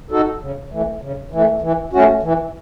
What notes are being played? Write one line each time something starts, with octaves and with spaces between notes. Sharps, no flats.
D#4 F#4 A4
C#3
E3 A3
C#3
E3 A3
E3
A3 C#4 F#4
E3